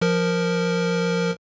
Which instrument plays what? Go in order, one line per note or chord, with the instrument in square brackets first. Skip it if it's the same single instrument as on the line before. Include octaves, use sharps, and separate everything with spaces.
[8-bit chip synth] F3 A#4